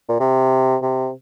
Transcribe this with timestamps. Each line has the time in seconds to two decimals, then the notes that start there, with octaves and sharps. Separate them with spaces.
0.09 A#2
0.20 C3
0.82 C3